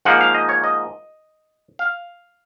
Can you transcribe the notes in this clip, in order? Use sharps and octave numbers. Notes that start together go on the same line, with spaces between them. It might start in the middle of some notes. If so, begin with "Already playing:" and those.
G#2 F3 A#3 F#5
F5
D#5
C#5
D#5
F5